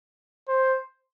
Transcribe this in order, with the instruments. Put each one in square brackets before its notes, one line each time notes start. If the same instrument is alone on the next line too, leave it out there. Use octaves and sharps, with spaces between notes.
[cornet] C5